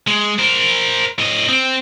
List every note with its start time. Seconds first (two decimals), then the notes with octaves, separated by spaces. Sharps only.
0.08 G#3
0.39 A#4 C5
1.19 A2 D#5
1.49 C4